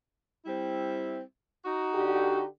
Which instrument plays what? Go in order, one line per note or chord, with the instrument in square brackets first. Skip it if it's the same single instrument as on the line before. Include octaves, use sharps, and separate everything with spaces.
[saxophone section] G3 C4 E4
D#4 F#4
[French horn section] D3 G4